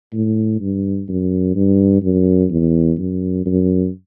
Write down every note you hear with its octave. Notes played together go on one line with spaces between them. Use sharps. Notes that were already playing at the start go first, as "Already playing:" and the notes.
A2
G2
F#2
G2
F#2
E2
F#2
F#2